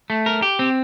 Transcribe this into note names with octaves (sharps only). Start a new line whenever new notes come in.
A3
A#4
G4
C4